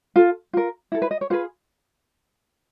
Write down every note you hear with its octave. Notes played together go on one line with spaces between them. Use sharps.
F4 A4
F4 A#4
E4 A4
B4
D#5
C#5
F4 G#4 B4 C5